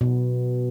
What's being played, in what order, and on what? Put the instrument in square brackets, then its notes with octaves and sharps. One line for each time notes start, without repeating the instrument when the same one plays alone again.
[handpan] B2